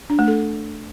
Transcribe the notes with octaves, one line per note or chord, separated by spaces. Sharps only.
D4
A3
A4